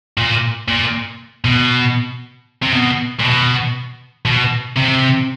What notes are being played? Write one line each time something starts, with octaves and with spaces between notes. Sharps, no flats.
A#2
A#2
B2
C3
B2
A#2
B2
B2
C3